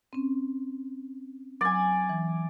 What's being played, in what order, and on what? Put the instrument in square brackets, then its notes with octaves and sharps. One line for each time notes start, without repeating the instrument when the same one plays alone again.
[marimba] C4 C#4
[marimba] F#3 [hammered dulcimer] D5 G#5
[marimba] E3